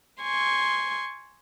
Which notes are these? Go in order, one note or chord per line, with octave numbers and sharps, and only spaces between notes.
G#5 C6 C#6